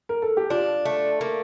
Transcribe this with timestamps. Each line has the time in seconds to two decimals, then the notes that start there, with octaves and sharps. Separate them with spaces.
0.09 A#4
0.22 A4
0.37 G4
0.50 D4 F4
0.85 A3
1.21 A#3